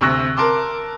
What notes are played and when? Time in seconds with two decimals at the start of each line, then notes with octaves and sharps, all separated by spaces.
0.01 D2 C3 C#6 E6 F#6 A#6
0.37 A#4 A5 C6 D6